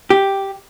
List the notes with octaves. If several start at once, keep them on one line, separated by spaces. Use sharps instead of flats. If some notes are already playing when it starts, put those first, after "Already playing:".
G4